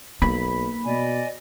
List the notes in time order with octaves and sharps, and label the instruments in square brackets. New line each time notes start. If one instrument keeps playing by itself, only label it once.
[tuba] B1 [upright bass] A#3 [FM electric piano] B5
[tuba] B2 [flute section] D5 D#5 G#5